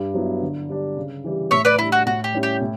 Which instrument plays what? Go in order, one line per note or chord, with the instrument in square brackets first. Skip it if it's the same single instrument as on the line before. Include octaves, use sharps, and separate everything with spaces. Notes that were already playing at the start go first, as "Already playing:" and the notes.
Already playing: [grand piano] G2
F#3 B3 E4
D3
G3 D4
C#3
E3 G3
[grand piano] A2 [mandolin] C#5 E5
[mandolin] B4 D5
[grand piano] G3 D4 [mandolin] E4
[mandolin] F#4
[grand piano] A2 [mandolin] F#4
[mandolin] G4
[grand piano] G3 C#4 E4
[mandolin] G4
[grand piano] A2